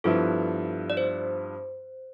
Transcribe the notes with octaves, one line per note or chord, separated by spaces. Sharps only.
G2 F3 B3 E4 A4
D5
C5